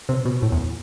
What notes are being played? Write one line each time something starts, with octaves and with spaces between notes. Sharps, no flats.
C3
B2
A2
E2